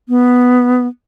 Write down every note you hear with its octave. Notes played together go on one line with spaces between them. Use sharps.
B3